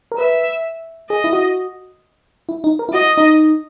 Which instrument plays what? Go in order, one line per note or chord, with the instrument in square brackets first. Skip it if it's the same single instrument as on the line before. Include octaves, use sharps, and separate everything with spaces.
[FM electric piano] A#4
[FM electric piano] B4 [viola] E5
[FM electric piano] G#4 [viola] D#5
[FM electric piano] E4
F#4
E4
D#4
A#4
E4
[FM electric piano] F#4 [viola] D#5
[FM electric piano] D#4